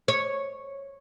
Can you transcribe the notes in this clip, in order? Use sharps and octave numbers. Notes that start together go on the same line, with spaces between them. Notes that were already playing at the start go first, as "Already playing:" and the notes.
C#5